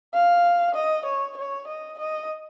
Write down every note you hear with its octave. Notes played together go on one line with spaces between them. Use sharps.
F5
D#5
C#5
C#5
D#5
D#5